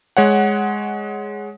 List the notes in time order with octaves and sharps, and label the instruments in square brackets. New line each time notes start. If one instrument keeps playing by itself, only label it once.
[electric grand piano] G#3 C#5 F#5